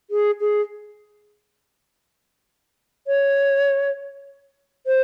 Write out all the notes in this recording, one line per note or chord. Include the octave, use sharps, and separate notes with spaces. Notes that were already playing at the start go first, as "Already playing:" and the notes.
G#4
G#4
C#5
C5